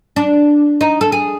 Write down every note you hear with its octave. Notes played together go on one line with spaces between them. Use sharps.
D4
D#4
A4
G#4